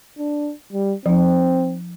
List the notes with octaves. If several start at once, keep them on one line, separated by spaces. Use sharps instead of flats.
D4
G3
F3 C4 D#4